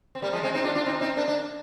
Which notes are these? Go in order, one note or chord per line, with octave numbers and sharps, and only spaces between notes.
C4
G3 A#3
F3 G#3
G#3 C4
C4 D#4
D4 F4
D4 F4
C4 D#4
C4 D#4
A#3 D4
A#3 D4